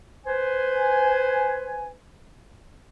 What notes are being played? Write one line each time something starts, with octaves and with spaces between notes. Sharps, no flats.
B4 C5 G#5